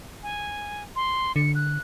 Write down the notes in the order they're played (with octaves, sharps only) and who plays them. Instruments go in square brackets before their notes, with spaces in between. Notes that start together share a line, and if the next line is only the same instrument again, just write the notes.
[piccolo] G#5
C6
[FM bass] D3 [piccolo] C#7
[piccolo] F#6